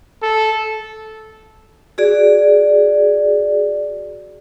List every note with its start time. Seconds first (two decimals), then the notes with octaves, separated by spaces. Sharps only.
0.22 A4
1.98 F#4 G#4 D5